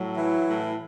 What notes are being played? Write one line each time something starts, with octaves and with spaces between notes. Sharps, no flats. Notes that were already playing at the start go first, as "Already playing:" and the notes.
Already playing: A2 F#3
E3 E4
A2